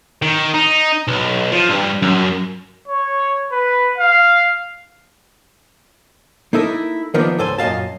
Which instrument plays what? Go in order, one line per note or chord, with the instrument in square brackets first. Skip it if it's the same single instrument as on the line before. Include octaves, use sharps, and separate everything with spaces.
[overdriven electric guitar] D#3
D#4
B1
F3
G2
F#2
[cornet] C#5
B4
F5
[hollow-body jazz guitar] A#3 D#4 E4 A4 A#4
D#3 F3 A#3 B3 D4
C#2 G#2 A4 C5 G#5
F#2 A#2 D#5 F5 A5